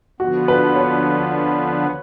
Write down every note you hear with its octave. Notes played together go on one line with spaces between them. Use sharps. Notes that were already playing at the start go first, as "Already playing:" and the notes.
D3 F3 B3 F#4
B4
C#5